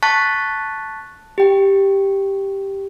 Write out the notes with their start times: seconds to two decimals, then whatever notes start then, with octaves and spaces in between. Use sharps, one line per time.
0.03 A5 C#6 F#6 A6 B6
1.38 G4 G5